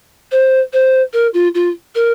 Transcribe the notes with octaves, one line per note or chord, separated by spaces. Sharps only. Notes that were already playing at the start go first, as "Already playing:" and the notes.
C5
C5
A#4
F4
F4
A#4